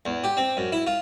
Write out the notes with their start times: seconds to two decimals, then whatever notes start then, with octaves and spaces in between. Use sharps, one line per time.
0.06 E2
0.24 G4
0.37 C4
0.57 F#2
0.72 E4
0.87 F4